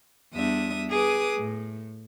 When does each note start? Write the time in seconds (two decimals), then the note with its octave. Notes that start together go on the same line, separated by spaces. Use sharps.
0.34 E2 G3 D4 E5 D#6
0.92 G#4 B4 D6 D#6
1.38 A2